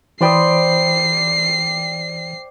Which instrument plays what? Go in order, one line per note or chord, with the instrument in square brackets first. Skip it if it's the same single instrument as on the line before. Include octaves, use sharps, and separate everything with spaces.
[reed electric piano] E3 B5 D#6 [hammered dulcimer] C5 D5 G5 [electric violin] C7